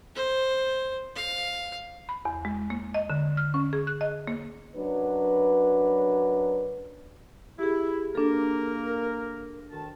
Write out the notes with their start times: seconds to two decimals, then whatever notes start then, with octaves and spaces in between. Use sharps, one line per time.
0.16 C5
1.16 F5
2.09 B5
2.25 E2
2.45 G#3
2.70 A#3
2.94 D#5
3.10 D3
3.37 F6
3.54 C#4
3.73 G#4
3.87 F#6
4.01 D#5
4.27 A#3
4.76 F#2 F#3 D4 B4
7.59 E4 G4 G#4
8.15 A#3 D4 A4 A#4
9.72 D2 D#3 A5